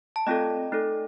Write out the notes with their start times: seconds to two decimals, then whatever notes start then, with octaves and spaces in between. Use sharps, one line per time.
0.16 A5
0.27 A3 C4 F4 A4 D#5 G5
0.72 A3 D#4 A4